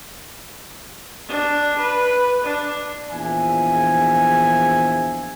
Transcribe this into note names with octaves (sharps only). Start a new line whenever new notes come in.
D4
B4
D4
A#1 E2 F3 E5 G#5